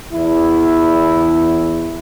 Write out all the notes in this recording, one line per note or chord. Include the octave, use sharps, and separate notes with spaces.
E2 E4